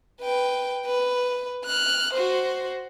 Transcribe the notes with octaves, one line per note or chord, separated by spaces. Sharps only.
B4 G5
B4
F6 F#6
F#4 C5